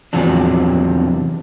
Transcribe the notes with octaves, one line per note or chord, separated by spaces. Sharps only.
E2 C3 F3 F#3 D4